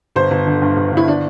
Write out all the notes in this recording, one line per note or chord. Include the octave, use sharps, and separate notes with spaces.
G1 C5
G1
D3
G2
G1
G1 E4
D4